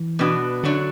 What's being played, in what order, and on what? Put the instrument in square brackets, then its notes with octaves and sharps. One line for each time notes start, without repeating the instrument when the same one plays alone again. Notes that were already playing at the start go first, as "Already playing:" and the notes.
Already playing: [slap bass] E3
[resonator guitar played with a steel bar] B2 B3 D4 F#4
[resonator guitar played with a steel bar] F#2 F#3 D4 [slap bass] D3